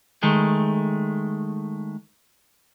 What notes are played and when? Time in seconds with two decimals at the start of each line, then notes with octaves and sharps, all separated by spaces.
0.23 D#3 G#3 A3